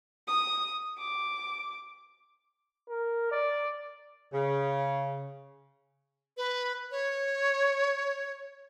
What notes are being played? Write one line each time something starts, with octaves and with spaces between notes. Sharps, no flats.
D#6
D6
A#4
D5
C#3
B4
C#5